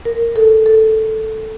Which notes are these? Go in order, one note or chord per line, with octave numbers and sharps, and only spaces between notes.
A#4
A4
A4